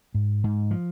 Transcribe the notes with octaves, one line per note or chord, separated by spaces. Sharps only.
G#2
G#2
F3